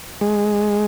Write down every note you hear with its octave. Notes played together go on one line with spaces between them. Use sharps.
G#3